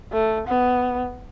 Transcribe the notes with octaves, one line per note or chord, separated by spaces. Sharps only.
A3
B3